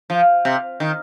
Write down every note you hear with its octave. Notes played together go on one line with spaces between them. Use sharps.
F3
C3
D#3